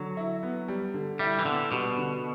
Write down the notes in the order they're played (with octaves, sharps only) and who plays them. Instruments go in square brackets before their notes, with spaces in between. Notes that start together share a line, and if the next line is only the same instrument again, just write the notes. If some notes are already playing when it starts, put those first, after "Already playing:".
Already playing: [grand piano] D3 [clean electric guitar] F#3
[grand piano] E4
B3
G3
D3
[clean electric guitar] G3 [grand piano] E4
[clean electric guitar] E3
[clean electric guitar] D3 [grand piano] B3
[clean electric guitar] B2 [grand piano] G3
[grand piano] D3